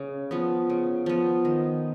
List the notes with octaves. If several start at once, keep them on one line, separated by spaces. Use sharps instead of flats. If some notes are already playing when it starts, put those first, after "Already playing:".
Already playing: C#3
F3 B3
C#3
F3 B3
D#3